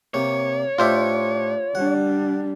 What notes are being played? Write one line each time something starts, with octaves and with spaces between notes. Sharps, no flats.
C3 A#3 C#5
A2 D4 F4 G4 C5 E5
G3 D4 F#5